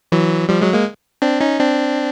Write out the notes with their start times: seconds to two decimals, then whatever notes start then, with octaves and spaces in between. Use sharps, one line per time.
0.12 E3 F#3
0.49 F3 G3
0.61 F#3 G#3
0.73 G#3 A#3
1.22 C4 D4
1.40 C#4 D#4
1.60 C4 D4